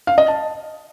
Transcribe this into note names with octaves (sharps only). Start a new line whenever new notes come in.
F5
D#5
A5